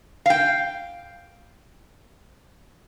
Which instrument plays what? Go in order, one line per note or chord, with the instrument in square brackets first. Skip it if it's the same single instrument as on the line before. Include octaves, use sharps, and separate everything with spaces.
[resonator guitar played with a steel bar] F5 G5